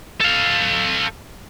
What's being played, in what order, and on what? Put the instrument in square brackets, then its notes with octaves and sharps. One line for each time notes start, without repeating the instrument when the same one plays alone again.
[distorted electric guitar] A4 F5